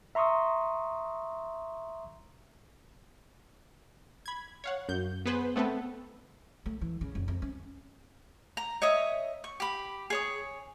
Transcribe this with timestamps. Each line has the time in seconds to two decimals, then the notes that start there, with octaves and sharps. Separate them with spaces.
0.15 E5 A#5 C6 C#6 D#6 E6
4.26 B5 G#6
4.64 C#5 F5 F#5
4.89 F#2 G6
5.26 B3 G#4 B4 C5
5.56 A3 B3 C4 A4 B4
6.66 A3
6.81 E3
7.01 C#3
7.15 F1
7.28 F2
7.42 C#4
8.57 A#5
8.82 C#5 D#5 E5 D#6
9.44 C#6
9.60 G4 B5
10.10 G#4 C#5 D#6